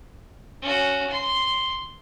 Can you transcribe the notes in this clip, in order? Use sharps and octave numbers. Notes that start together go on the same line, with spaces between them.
C#4 F#4
C6